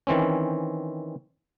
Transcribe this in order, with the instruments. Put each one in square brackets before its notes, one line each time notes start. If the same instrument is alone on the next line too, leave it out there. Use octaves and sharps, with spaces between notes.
[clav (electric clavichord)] D#3 E3 C4 C#4